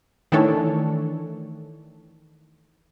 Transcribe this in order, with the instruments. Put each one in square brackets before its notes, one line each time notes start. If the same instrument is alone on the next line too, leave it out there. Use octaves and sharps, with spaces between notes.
[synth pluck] D#3 E3 A3 D4 A4 C#5